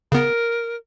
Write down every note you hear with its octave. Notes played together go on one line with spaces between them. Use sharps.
C#3 B3 A#4